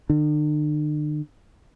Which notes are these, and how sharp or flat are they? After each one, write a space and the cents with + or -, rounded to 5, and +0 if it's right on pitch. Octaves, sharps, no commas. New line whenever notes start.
D3 +40 D4 +45